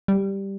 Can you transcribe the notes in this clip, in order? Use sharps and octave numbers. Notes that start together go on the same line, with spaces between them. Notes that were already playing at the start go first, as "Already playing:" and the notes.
G3